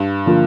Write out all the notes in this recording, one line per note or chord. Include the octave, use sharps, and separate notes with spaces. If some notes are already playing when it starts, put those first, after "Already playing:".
Already playing: G2
D3 F3 A#3 F4